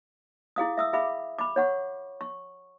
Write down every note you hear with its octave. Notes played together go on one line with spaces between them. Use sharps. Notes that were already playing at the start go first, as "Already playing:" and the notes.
E4 G#4 F5 D#6
E5 D#6 E6
G#4 E5 F5 B5 D6
B5 D6
C#5 F#5 C#6
C#6